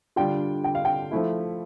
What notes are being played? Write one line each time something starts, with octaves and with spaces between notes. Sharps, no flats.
D3 G3 D4 F4 G5
G5
F5
G5
F3 A3 E4